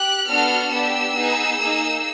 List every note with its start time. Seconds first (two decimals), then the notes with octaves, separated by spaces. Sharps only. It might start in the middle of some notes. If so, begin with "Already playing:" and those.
Already playing: G4 F#6
0.28 B3 D4 F#4 A4 F6
0.72 B3 D4 G4 E6
1.16 B3 D#4 G#4
1.60 A#3 D#4 G#4